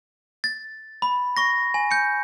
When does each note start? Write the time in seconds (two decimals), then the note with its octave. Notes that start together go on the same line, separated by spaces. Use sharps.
0.44 A6
1.02 B5
1.37 C#6 A#6
1.74 G#5
1.91 G6 C#7